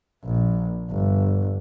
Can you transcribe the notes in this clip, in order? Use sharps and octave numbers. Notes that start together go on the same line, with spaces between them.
A#1
G1